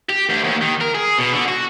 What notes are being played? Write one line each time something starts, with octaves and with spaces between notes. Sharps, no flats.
G4
D2
D#2
D#3
A#4
G#4
B2
D3
F#4